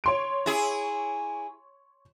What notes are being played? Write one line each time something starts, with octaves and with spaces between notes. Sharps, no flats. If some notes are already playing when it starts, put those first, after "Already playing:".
C#5 C6 D7
E4 G#4